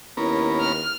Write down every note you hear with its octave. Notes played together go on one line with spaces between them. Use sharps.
D#2 B3 C#4 E4 A#4
F6